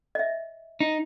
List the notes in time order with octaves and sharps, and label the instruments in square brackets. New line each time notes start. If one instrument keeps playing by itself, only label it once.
[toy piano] D#5 E5
[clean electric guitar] D#4